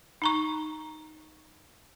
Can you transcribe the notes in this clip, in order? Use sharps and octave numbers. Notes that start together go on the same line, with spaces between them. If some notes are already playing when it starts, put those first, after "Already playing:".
D#4 A#5 C#6